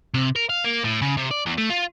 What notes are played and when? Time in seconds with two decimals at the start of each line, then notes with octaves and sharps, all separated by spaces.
0.14 C3
0.36 A#4
0.49 F5
0.64 A#3
0.84 A2
1.02 C#3
1.17 C3
1.31 D5
1.46 E2
1.58 A3
1.70 F4